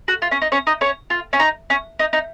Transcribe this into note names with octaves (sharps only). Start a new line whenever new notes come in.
F#4
F4
C#4
D#4
C#4 C#5
D#4 D#5
C#4 C#5
F4
C#4
D#4
C#4
D#4
D#4